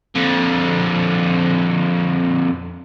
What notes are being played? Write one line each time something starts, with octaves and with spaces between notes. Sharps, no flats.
F2 D3